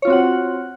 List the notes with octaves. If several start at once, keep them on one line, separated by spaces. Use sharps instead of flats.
C4 F4 F#4 C#5 F#5